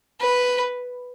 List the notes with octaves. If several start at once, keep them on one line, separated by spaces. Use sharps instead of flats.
B4